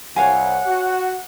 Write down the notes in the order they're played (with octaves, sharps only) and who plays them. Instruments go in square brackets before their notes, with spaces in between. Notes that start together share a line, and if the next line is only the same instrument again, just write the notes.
[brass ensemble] C2 [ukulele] C#5 F5 G#5 [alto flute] F#5
[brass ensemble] F#4